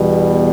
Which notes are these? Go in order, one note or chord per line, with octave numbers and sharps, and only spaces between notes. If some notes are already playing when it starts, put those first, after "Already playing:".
Already playing: E2 B2 G3